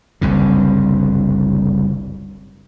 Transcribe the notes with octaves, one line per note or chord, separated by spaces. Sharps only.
F#1 C2 G2 D3